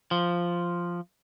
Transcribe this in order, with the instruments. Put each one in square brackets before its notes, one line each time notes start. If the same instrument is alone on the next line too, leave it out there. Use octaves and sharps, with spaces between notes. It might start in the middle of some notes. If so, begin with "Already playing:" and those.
[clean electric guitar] F3